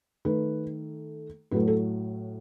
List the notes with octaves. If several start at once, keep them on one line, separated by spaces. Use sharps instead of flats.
D#3 A3 B4
A2 F#3 A3 B4
A4